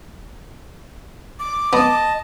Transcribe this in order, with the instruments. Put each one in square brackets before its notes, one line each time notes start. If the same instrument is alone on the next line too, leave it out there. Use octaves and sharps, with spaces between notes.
[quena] D6
[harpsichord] B3 [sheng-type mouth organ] D#5 A5